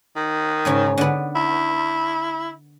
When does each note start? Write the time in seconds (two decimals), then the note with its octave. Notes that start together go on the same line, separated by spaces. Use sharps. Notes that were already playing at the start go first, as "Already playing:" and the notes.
0.16 D#3
0.65 G#2 C#3 G#3
0.98 D3 B3
1.36 E4